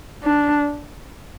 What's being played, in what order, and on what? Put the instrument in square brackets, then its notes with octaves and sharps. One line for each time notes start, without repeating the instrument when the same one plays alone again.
[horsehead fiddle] D4